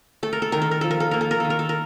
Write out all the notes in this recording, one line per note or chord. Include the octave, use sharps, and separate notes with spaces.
A3 A4
A#4
A4
D#3 A#4
A4
A#4
F3 A4
A#4
A4
A#3 A#4
A4
A#4
D#3 A4
A#4
A4
A#4